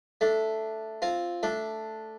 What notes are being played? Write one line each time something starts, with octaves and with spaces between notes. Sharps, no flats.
A3 D4
C4 F4
A3 D4